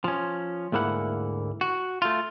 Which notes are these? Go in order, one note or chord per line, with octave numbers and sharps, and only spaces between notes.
F3 C#4
D2 G#2 A#3 E4 F#5
F#4
A3 F4